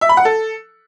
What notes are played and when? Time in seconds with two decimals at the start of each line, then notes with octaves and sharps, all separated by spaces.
0.01 E5
0.09 B5
0.17 F#5
0.25 A4